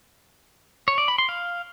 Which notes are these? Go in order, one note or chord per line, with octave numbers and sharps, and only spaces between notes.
C#5
D5
B5
C6
F5